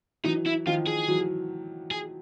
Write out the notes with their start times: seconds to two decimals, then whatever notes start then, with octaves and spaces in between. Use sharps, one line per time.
0.24 E3 F#3 D#4
0.46 E4
0.66 D#3 F3 F4
0.87 G#4
1.08 E3 F#3
1.91 G#4